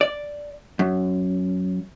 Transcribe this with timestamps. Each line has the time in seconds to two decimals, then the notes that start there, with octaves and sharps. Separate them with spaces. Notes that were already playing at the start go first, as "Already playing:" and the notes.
0.01 D5
0.79 F#2